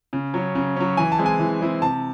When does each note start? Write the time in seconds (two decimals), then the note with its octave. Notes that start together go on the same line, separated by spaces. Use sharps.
0.13 C#3
0.34 F#3 C#4
0.55 C#3
0.76 F#3 C#4
0.97 E3 G#5
1.12 A5
1.19 G#3 C4 E4
1.26 G#5
1.40 E3
1.61 G#3 C4 E4
1.82 C3 A5